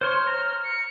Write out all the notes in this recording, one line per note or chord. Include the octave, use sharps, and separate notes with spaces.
C5 C#5 C6 F6
A#5
C#7